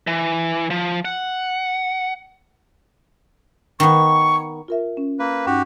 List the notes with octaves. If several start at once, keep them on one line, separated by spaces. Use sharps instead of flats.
E3
F3
F#5
D#3 B3 C#6
F4 A#4 E5
C#4
A#3 B4
G2 C#4 D#4 F#4 G4